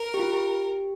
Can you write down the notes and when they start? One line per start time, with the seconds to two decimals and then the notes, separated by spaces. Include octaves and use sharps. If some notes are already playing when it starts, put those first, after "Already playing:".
Already playing: A#4
0.14 G4
0.19 F4
0.33 G4